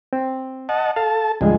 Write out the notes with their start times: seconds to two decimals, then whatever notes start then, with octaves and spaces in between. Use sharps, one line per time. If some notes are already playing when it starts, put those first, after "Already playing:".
0.13 C4
0.69 D#5 F#5 A5
0.96 A4 F5 A5
1.41 D2 G#2 F3 G3 G#3 G#4